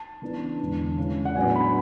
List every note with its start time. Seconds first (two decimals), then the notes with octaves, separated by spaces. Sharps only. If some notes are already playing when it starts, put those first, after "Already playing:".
Already playing: A5
0.22 C#3 E3 B3 D4
0.60 E2 D3 G#3 D4
0.98 C#3 E3 G#3 C#4 E4
1.25 F#5
1.36 A2 F#3 B3 D4 G#5
1.55 B5